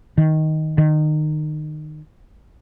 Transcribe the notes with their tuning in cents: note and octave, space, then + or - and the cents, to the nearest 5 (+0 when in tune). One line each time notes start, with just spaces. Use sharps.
D#3 +5
D#3 -25